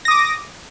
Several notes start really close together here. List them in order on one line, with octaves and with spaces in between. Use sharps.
A#6 D#6 D6